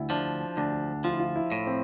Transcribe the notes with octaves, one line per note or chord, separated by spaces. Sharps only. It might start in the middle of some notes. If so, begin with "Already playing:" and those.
Already playing: D2 E4
F3 D4
D2 D4
F3 F4
E4
F4
E4
A2
C4